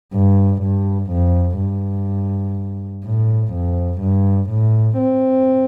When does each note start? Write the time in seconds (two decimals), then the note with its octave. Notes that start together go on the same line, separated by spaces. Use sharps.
0.14 G2
0.63 G2
1.12 F2
1.59 G2
3.05 A2
3.53 F2
4.01 G2
4.50 A2
4.98 C4